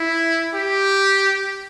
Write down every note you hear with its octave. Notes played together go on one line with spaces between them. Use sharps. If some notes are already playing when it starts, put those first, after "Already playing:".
Already playing: E4
G4